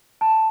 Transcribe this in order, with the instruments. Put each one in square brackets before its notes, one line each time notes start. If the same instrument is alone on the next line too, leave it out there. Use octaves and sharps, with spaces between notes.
[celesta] A5